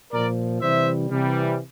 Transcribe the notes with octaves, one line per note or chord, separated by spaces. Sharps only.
A#2 F3 A#4 D5
C3 E3 G3 C5 E5
C3 E3 G3